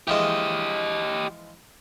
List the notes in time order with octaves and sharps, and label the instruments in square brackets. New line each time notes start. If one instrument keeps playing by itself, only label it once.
[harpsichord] E3 F3 G#3 [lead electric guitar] G4 D#5